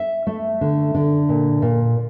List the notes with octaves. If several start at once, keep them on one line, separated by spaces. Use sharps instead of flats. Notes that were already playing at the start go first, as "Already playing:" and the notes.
Already playing: E5
A3
D3
D3
A#2
A#2